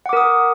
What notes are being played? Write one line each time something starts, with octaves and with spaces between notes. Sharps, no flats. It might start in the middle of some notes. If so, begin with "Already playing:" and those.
A#4 F#5 D6 D#6